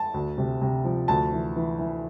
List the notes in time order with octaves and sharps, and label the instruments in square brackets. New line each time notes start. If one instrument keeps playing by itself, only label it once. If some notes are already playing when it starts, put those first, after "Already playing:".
Already playing: [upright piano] A5
D2
C3
C3
F3
D2 A5
E3
E3
E3